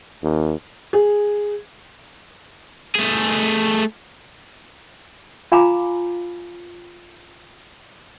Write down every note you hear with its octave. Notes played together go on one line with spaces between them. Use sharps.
D#2
G#4
A3 G#4
F4 F5 G#5 A#5 B5 D6